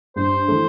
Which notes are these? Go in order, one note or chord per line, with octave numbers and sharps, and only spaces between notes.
G2 C5
E3 A3